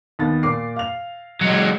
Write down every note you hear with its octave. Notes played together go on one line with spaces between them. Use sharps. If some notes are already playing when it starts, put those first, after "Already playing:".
D#2 B3 A6
A#2 D6 C7
F5 F7
F#3 G#3